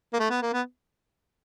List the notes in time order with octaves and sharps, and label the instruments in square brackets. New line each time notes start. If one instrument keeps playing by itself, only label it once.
[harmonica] A#3
A3
B3
A#3
B3